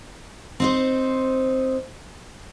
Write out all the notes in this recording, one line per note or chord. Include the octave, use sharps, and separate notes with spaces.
C4 D#4 C5